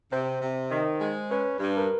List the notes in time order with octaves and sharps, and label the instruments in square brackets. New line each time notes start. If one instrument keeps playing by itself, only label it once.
[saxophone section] C3 [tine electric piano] C5
[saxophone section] C3
D#3
G#3
[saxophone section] C#4 [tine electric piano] B4
[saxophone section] G2
[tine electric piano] A#4